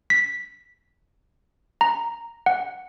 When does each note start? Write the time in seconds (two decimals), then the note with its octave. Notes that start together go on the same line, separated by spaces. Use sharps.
0.10 B6
1.81 A#5
2.46 F#5